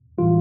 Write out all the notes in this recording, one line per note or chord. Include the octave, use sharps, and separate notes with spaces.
A2 E3 G3 F4